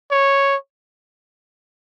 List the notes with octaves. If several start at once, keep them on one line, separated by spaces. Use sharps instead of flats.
C#5